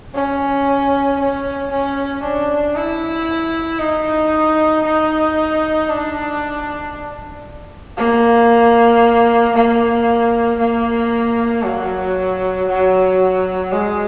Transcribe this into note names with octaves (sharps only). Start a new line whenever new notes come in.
C#4
C#4
C#4
D4
E4
D#4
D#4
D4
A#3
A#3
A#3
F#3
F#3
G#3